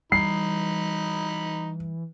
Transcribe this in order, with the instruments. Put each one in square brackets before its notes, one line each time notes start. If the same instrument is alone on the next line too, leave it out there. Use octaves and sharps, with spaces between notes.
[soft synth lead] E3 [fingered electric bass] G3 [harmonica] D#4 B5 [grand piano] C7